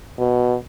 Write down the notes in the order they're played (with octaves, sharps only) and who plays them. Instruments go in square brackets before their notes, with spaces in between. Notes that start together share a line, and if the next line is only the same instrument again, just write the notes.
[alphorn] B2